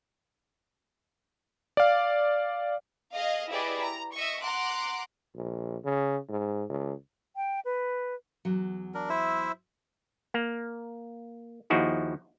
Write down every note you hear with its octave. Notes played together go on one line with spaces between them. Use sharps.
D5 F5
G#4 D#5 F5
E4 G4 G#4 B4 D5 D#5
A#5
D#5 E5 C#6
F#5 A#5 C6 D6 F#6
A#1
C#3
G#2
C#2
G5
B4
E2 F#3
D4 A#4
E4 C5 E5
A#3
D#2 F3 D#4 E4 F#4 G#4